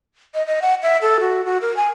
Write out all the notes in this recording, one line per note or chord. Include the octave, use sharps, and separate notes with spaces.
D#5
D#5
F#5
E5
A4
F#4
F#4
A#4
G#5